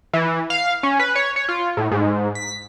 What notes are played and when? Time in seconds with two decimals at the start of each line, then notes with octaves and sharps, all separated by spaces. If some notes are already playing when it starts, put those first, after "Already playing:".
0.13 E3
0.50 F5
0.83 C#4
0.99 B4
1.15 C#5
1.36 C#5
1.49 F4
1.77 A2
1.92 G#2
2.35 B6